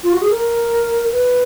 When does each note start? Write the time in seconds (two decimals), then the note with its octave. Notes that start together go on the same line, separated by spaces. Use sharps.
0.03 F4
0.13 F#4
0.21 G#4
0.31 A#4
1.12 B4